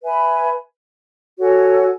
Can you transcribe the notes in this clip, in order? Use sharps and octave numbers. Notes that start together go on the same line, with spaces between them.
B4 E5 G#5 B5
F#4 A4 C#5 G#5